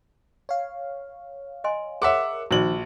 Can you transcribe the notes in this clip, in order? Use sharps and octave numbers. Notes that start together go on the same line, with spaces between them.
C#5 F5
D#5 G#5 C6
G#4 A#4 C#5 E5 F#5 C6 D6
A#1 D#3 F3 D#4 F#4 C5 D5 F#7